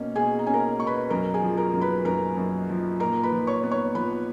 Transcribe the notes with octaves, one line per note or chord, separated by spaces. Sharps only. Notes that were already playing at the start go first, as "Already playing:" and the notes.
Already playing: B2 A#3 C#4
B2 G#4 G#5
A#5
C#4 G#5
A#4 A#5
B2 C#6
B4 B5
F#2 A#4 A#5
G#4 G#5
F3
A#4 A#5
F#2
B4 B5
F#2 A#4 A#5
F#2
F3
A#2 A#4 A#5
B4 B5
F3
C#5 C#6
B3
C#5 C#6
F3 B4 B5